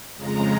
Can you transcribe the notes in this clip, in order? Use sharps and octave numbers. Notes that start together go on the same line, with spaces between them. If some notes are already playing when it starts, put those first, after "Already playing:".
F2 C#3 F3 G#3 A#5